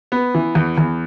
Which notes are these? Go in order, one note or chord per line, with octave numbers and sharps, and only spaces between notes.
B3
E3
E2
E2